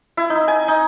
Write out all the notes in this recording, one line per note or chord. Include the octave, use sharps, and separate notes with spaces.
E4
D#4
G#5
D#4